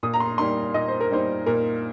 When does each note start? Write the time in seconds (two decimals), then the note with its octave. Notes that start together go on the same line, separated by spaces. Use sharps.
0.03 A#2 D#6
0.14 A#5
0.20 C6
0.38 G3 A#3 D#4 C6
0.74 A#2 D#5
0.88 C5
1.01 A#4
1.11 G3 A#3 D#4 C5
1.46 A#2 A#4